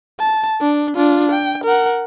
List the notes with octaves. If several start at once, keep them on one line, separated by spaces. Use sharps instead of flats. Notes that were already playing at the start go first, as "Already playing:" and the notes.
A5
D4
D4 F4
G5
A#4 F#5